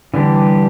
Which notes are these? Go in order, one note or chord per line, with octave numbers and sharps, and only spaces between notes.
D3 E3 G3 D4 G4